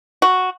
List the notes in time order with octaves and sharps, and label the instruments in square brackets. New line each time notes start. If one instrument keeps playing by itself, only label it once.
[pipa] F#4